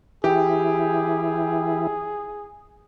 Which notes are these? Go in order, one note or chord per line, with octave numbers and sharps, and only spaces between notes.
E3 E4 G4 G#4